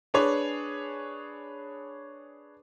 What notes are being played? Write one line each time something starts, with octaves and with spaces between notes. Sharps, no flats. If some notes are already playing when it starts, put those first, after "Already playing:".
D4 G#4 B4 C#5